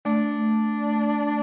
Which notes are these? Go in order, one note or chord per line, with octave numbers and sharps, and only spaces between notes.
A3 D4